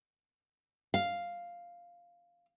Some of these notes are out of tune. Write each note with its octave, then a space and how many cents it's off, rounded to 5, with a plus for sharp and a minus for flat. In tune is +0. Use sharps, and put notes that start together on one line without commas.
F5 +0